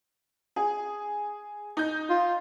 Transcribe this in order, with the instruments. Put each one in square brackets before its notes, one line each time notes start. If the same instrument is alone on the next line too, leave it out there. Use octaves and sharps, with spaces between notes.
[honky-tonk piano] G#4
D#4 G6
[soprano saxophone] F4